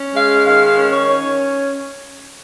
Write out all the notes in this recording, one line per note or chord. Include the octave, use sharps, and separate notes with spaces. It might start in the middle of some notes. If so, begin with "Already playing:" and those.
Already playing: C#4
G#3 F5
D#3 F5
C#4
C#5
C#4